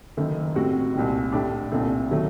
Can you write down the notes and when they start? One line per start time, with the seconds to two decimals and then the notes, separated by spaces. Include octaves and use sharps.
0.17 F#1 F#2 D#3 A3
0.56 A2 G3 C4 F#4
0.94 C2 A#2 G3 C4 D#4
1.32 A2 A3 D4 G4
1.70 C2 A#2 A3 C4 D#4
2.11 D#3 F#3 A3